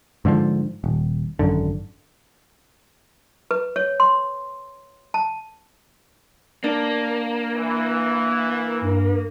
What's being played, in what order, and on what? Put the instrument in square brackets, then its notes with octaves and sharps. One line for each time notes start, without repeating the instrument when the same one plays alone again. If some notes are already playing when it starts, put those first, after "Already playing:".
[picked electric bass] G#2 D3 D#3 F3
D#1
G#1 F#2 D3
[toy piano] B4
C#5
C6
A5
[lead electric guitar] A#3 [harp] D4
[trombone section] E3
[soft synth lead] G2